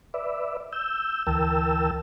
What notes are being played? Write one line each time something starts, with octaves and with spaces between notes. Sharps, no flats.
B4 D5 E5
E6 G6
D2 E3 A#4 G5 A5 E6